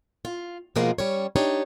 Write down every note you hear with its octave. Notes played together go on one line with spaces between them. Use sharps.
F4
B2 F3 G#3 A#3 F4 G#4
G3 C#4 C#5
D4 D#4 G4 C#5